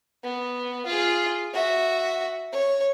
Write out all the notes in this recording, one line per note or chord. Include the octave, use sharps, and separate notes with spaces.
B3
F4 G#4
F#4 E5
C#5